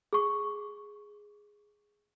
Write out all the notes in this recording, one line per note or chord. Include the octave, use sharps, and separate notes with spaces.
G#4 C#6